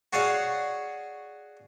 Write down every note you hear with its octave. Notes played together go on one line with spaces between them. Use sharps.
F#4 G#4 C#5 D5 F5 F#5